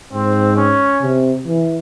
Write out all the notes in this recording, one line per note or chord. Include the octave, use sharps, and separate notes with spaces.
G#2 C4
C#4
C3
E3